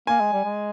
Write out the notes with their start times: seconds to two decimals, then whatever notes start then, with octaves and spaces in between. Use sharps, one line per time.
0.07 A#3 G#5
0.20 G#3
0.33 G3
0.44 G#3